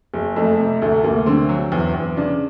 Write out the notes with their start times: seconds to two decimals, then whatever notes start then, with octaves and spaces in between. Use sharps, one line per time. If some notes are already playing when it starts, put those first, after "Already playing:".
0.14 F#1
0.36 F2 A3
0.59 C3
0.82 D2 A3
1.04 D2 A#3
1.26 D3 C4
1.49 F#3
1.72 E2
1.94 E2
2.17 C#3 D4